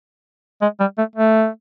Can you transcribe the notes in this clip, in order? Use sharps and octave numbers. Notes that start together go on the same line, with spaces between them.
G#3
G3
A3
A3